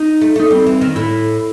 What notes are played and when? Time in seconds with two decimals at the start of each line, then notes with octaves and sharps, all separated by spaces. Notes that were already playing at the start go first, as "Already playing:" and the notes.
Already playing: D#4
0.21 A3
0.36 A3 D#4
0.51 G3 C4
0.66 E3
0.81 D#3
0.95 A2 E4